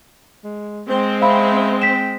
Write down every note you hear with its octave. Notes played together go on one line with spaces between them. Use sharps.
G#3
G#3 C4 C5
E5 F5 B5
G5 B6 E7